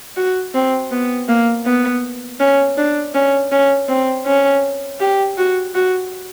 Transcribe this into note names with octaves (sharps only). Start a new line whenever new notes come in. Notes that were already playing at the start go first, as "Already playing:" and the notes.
F#4
C4
B3
A#3
B3
C#4
D4
C#4
C#4
C4
C#4
G4
F#4
F#4